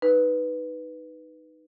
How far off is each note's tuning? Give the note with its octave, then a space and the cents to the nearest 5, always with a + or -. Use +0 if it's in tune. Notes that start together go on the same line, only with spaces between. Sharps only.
D#4 +0 B4 +0